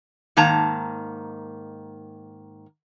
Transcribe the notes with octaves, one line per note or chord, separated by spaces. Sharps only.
G#2 D#3 A#3 A5 A#5